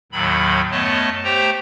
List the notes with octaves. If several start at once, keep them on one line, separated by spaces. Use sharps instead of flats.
D#2 A2 D#3 F#3 B5
F#2 A3 B3 C#5 D#5 A5
A3 G4 C5 G5 A#5